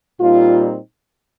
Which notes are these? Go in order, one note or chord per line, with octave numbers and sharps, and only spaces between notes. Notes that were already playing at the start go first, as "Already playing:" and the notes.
A#2 G3 C4 D#4 F4